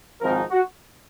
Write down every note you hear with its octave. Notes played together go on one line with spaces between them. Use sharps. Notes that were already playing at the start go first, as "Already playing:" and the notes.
G#1 G#2 F3 C4 D#4 A#4
F#4